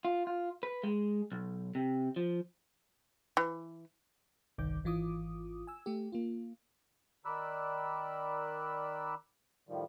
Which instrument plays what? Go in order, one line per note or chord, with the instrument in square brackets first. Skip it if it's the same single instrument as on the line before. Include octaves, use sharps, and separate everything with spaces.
[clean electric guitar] F4
F4
B4
G#3
B1
C3
F3
[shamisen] E3
[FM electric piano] G1 C2 D#3 D6 G6
G#1 E3 F4 D6 D#6
G#5 E6
A3 G4
A#3 F4
[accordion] D#3 A#4 D5 B5 E6 F#6
A2 D#3 F3 G3